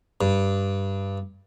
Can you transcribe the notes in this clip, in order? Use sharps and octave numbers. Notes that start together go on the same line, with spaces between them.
G2